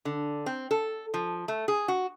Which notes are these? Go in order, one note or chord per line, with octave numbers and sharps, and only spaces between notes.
D3
C4
A4
F3
A3
G#4
F#4